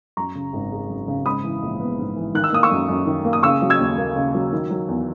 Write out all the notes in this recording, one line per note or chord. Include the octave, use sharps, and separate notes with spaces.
F#2 A#5 C#6
C#3
G#1
G#3
F#2
C#3
G#2 B5 D#6
E3
A#1
B3
G#2
E3
D#3 F#6
E6
A#3 D#6
C#6 E6
F#2
F#2
D#3
A#3
D#6
C#3 C#6 E6
F#3
E6 G#6
D#2
A#3
C#3
F#3
D#3
F#3
E2